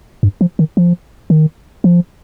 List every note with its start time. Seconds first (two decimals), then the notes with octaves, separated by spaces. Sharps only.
0.23 G2
0.41 F3
0.59 D#3
0.77 F3
1.30 D#3
1.84 F3